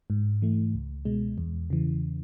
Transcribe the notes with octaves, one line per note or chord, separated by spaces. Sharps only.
G#2
E3 A3
C#2
B2 G#3
E2
C#3 E3